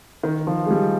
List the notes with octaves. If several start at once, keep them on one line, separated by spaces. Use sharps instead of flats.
D#3
F3
G#3
G3